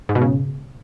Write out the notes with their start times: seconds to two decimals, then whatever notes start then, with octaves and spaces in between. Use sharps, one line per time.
0.09 G#2
0.15 B2
0.22 C#3